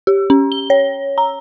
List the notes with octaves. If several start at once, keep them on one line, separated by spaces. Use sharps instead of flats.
G4
C#4
G7
C#5
A#5